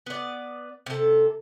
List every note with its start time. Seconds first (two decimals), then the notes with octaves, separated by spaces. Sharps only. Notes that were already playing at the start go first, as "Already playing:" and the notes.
0.06 B3 D5
0.86 C3 A4